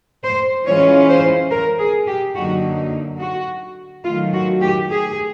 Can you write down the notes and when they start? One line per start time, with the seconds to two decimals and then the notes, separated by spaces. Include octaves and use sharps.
0.23 C5
0.66 E3 G#3 C#4 F4 C#5
1.09 C5
1.50 A#4
1.79 G#4
2.07 G4
2.35 F#2 D3 F#3 A#3 D#4 F#4
3.20 F#4
4.04 D#3 F#3 A3 F4
4.33 F#4
4.61 G4
4.90 G#4